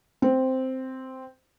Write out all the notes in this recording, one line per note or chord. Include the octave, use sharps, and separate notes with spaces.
C4